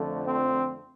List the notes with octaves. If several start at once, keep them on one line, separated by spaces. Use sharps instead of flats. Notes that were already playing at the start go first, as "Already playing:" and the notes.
Already playing: F2 D3 F3 A3
C4